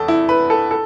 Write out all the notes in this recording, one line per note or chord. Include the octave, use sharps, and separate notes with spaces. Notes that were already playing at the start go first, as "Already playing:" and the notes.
Already playing: E2 A4
E4
B4
A4
A4